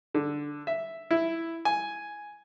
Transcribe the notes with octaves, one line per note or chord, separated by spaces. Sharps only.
D3
E5
E4
G#5